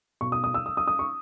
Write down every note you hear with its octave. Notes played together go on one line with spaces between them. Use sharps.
B2 C#6
D#6
D#6
E6
D#6
D#6
D#6
C#6